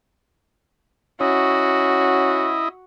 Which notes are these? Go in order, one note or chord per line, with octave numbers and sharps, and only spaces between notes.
C#4 E4 F#4 D#5